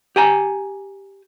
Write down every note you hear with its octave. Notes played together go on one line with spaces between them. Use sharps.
G4 G#5 A#5